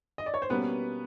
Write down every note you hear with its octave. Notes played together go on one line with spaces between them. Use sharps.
D#5
D5
C#5
C5
B2 G3 A#3 B3 C#4 B4